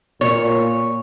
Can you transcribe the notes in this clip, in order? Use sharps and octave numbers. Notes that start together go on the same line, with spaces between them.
A#2 C#5